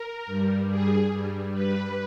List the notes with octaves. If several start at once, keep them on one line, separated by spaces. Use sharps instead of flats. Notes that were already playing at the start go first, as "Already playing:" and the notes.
Already playing: A#4
G2 G3
G#4
G2 G3
B4